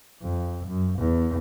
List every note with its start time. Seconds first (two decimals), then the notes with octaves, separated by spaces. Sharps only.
0.22 F2
0.68 F#2
1.00 E2